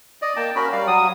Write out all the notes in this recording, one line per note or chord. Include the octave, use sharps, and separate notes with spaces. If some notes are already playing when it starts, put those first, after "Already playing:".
D5 D#5
A#3 G5 A5
C#4 F#4 A#4 B5
G3 D5 F5
F#3 D#6